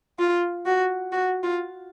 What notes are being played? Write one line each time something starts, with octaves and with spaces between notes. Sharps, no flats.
F4
F#4
F#4
F4